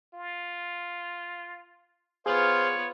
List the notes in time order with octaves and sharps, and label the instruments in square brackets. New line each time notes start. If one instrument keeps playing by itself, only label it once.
[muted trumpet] F4
[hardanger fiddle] B3 F4 [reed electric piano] G#4 F6 [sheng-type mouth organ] C5 F5 C6 [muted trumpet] C#5